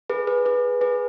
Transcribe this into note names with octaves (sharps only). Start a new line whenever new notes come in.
G#4 B4
G#4 B4
G#4 B4
G#4 B4